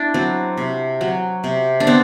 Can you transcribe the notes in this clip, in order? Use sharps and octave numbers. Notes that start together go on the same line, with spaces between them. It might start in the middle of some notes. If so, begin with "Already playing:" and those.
Already playing: D4 E4
F#3 C4
C3
F#3
C3
D4
B3 C4